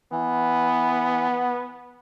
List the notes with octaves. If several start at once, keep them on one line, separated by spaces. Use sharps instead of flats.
E3 B3